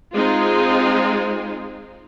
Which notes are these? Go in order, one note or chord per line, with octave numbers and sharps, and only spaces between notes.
G#3 C4 D#4 F4 G#4